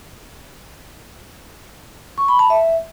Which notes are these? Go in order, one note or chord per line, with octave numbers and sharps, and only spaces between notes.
C#6
B5
A5
E5